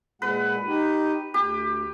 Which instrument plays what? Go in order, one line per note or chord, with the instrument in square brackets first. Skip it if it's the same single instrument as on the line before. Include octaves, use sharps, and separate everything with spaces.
[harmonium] A#2 G#3 F#5 [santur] B4
[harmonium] D#4 G4
[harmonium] D2 [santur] G4